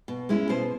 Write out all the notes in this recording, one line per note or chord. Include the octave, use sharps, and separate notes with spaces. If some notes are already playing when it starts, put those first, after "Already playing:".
B2
G#3 C#4 E4
B2 C5